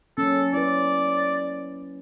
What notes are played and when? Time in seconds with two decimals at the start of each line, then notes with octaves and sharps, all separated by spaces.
0.18 F#3 A#3 C#4 A4
0.54 E4 B4 D5